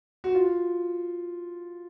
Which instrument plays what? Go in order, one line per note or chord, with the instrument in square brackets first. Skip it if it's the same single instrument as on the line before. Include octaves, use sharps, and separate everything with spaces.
[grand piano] F#4
F4